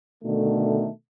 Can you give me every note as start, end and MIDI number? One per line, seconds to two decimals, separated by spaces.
0.24 0.89 47
0.24 0.89 50
0.24 0.89 51
0.24 0.89 57